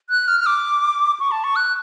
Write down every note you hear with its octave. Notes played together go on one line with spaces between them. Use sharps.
F#6
F6
F6
D6
C#6
A5
C#6
F#6